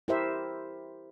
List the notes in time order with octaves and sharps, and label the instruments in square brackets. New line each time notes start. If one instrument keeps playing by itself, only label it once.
[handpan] E4 G4 A#4 C5 E5